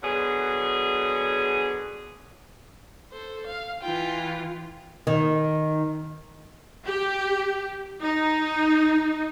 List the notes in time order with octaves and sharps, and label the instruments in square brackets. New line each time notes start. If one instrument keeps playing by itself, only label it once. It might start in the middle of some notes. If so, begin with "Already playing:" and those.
[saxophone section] B2 D3 F#3 G#4
[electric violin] A4 C5
F5
[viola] E3 F4 [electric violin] G5
[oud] D#3
[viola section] G4
D#4